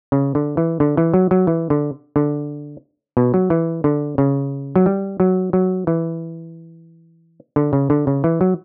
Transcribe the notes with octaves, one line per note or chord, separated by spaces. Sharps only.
C#3
D3
E3
D3
E3
F#3
F#3
E3
D3
D3
B2
F#3
E3
D3
C#3
F#3
G3
F#3
F#3
E3
D3
C#3
D3
C#3
E3
F#3